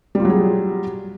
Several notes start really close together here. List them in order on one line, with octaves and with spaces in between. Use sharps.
G3 F4 F#3 G#4